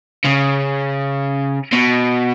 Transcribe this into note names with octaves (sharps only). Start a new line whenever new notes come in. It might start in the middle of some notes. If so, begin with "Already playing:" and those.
C#3
B2